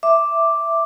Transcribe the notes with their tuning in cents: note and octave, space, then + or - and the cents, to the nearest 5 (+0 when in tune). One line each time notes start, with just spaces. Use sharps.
E5 +0 D6 +0